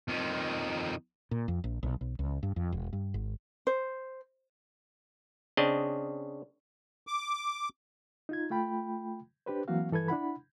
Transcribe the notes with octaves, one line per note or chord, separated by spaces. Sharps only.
F2 D#3
A#2
F2
A#1
B1
B1
C#2
G2
F2
E1
G2
G#1
C5
C#3 C4 D4 D#5
D6
D#4 F4 G#6
A3 F4 G5 B5
D4 G4 B4 C5
E3 F#3 A#3 C4 F#4 F5
G2 E3 A4 B4 G#6
D4 E4 F#5 B5